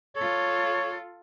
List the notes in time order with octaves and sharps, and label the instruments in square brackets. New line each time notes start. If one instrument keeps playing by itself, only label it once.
[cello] F4 A4 [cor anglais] C#5